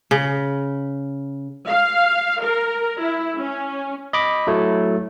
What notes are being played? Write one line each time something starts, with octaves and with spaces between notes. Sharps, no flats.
C#3
F5
A#4
E4
C#4
D#5 B5 D6
F#3 A3 E4